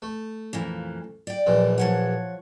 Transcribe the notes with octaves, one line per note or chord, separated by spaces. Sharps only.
A3
F2 A#2 E3
D5 G5
A#1 F#2 E3
F3 C#5 F#5